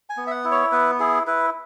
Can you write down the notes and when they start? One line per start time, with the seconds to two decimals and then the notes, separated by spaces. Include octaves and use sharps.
0.10 G#5
0.17 B3
0.27 E5
0.31 F#5
0.45 E4
0.51 C#5
0.72 B3 B4
1.00 E4 G#4
1.27 E4 B4